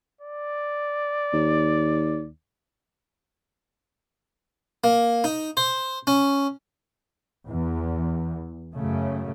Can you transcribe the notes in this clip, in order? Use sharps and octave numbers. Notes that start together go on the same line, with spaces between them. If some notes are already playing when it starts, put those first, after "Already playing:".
D5
D#2
A#3
D#4
C5
C#4
E2
F#2 C#3 A3